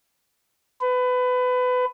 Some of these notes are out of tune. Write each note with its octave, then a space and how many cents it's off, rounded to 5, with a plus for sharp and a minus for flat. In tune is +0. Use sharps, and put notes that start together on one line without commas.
B4 +25